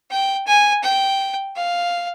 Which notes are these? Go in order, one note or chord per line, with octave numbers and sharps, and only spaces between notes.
G5
G#5
G5
F5